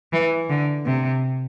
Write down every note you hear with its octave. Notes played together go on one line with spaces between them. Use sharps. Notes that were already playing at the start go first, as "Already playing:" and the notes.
E3
D3
C3